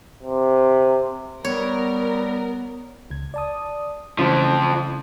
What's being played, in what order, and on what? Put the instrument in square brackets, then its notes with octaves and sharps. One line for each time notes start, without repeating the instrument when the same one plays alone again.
[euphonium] C3
[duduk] G3 [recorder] B3 [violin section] A#4 [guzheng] C#5
[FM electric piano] C#2 G#6
D5 A5 D#6
[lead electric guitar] F2 F3 [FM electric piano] C#3 E3 A3